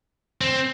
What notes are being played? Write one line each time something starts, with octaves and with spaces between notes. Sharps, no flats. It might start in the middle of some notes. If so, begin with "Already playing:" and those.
C4